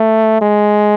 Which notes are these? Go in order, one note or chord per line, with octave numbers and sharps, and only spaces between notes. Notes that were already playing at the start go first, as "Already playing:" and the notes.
Already playing: A3
G#3